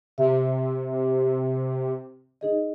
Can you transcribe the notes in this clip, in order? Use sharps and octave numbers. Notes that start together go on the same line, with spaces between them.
C3 E5
D#4 G#4 D#5